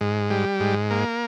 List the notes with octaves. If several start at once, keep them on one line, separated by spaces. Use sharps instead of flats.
G#2
G3
G#2
A#3